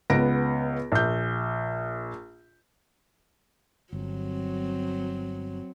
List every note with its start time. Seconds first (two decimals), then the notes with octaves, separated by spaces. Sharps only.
0.10 C#2 B3 A#6 D7
0.92 A#1 G6
3.93 G1 F#3 C4